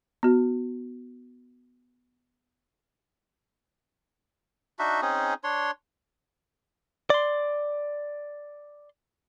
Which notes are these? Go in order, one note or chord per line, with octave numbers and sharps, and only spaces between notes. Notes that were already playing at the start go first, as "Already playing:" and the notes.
B3 F#4
D4 D#4 F#4 E5
C4 C#4 D#4 G#4
D4 C#5 C6
D5 C6